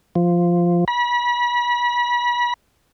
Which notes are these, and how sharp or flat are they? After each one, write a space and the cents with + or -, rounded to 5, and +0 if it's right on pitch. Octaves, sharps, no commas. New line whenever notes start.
F3 -5
B5 -35